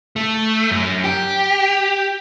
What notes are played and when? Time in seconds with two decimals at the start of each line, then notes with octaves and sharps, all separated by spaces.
0.16 A3
0.70 F#2
1.04 G4